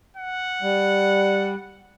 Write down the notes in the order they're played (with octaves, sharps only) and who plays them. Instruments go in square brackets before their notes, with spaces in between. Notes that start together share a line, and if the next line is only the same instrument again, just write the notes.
[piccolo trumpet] F#5
[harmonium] G3